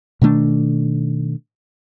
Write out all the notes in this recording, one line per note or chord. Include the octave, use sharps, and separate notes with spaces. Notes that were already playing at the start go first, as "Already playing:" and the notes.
B2 D#3 A3 D4